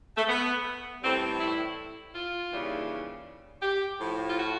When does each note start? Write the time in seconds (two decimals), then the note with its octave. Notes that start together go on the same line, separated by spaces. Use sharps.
0.16 A3
0.28 B3
1.03 A2 E3 G3 C4
1.40 E4
2.14 F4
2.51 D#2 C#3 E3 G3
3.62 G4
3.99 A2 F3
4.29 F4
4.37 F#4